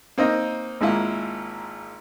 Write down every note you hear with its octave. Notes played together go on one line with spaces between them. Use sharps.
A#3 C4 D#4 D#5
G#1 G#2 A#3 E4 F4